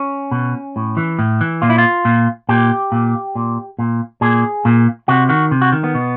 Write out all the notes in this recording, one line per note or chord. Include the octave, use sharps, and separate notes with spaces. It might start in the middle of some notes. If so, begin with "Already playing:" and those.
Already playing: C#4
B2
A2
E3
A2
E3
A#2 F4
E4
F4
A#2
A#2 G4
A#2
A#2
A#2
A#2 G#4
A#2
C3 F#4
D#3 F#4
C3
F#4
D#3
B3
B2